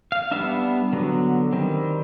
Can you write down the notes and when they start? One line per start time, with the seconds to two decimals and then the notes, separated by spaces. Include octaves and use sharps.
0.12 F5
0.31 G3 B3 D4 E5
0.93 D3 F#3 B3
1.53 D#3 G3 C4